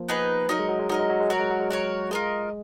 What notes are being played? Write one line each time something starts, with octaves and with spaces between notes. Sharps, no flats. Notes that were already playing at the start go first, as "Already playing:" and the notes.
Already playing: F3 A#3
B3 D#4 G#4 B4
F#3 D#4 A#4 D#5
G#3
F#3
G#3
F#3 D#4 A#4 D#5
G#3
F#3
G#3
F#3 F#4 A#4 C#5
G#3
F#3
G#3
F#3 F#4 A#4 C#5
G#3 F4 A#4 D#5